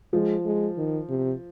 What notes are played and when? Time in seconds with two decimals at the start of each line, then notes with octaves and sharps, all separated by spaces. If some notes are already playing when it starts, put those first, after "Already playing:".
0.13 F3 G#3
0.45 G#3
0.77 D#3
1.10 C3